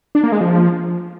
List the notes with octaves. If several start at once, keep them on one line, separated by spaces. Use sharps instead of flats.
D4
A#3
G#3
F3